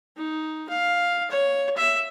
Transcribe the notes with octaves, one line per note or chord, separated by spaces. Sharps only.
D#4
F5
C#5
E5